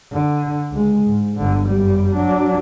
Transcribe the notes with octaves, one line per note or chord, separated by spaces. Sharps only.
D3
C#2 G#3
G#2
G1 D3
F#2 G3
F#3 D4